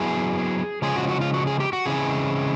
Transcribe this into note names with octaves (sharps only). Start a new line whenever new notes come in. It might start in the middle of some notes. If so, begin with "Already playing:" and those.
Already playing: F#3 B3 E4 G#4
C#3 F3 G#3 F4 G#4
F#4
F#4
F4
F#4
G#4
G4
F#4
C#3 E3 G#3 C4 E4 G#4